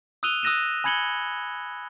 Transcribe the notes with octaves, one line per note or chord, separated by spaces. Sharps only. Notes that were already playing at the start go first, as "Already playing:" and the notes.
D#6 E6 F#6 D#7 F7 G7
D#6 E6 F#6 A#6 D#7 E7
G#5 B5 G#6 C#7 F#7 G7